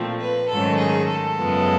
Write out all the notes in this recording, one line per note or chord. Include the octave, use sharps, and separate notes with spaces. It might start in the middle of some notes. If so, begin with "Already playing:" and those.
Already playing: A#2 F3 A3 C4
B4
G#2 D#3 F#3 A3 C#4 A4
G#4
A4
F#2 C#3 F3 G#3 B3